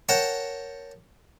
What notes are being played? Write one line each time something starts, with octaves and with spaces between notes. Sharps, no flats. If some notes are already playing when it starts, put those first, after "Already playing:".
A#4 C#5 F#5 G5 A5